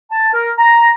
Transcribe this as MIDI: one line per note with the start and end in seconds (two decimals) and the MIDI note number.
0.11 0.30 81
0.33 0.50 70
0.58 0.92 82